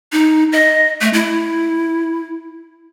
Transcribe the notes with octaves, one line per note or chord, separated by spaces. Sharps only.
D#4
D#5
A3
E4